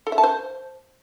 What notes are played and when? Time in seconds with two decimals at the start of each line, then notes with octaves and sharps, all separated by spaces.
0.07 A4
0.12 E5
0.18 A5
0.24 C5